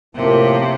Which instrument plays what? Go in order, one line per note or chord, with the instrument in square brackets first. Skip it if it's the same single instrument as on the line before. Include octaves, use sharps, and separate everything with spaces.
[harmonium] A2 F3 A#3 [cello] C3